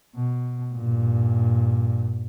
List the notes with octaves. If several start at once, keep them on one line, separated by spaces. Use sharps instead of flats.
B2
G2 A#2